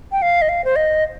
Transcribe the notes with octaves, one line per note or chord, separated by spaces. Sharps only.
G5
F5
D#5
F5
C5
D#5